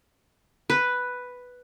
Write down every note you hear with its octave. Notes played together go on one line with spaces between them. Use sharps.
B4